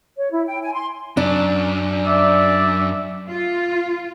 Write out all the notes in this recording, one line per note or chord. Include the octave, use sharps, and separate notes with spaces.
C#5
E4
G5
G#5
C6
F#2 D4
D5 E5
F4